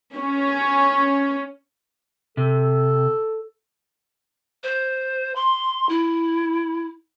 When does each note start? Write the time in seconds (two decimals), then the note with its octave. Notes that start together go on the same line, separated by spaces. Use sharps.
0.15 C#4
2.37 C3 A4
4.63 C5
5.35 C6
5.89 E4